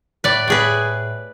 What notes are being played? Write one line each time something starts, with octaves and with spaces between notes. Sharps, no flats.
A2 B4 D5
A2 G#4 B4